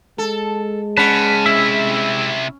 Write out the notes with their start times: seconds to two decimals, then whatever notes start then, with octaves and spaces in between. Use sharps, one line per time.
0.18 G#3 A4
0.97 C#4 B4 F#5 A5
1.46 C3 E4 E5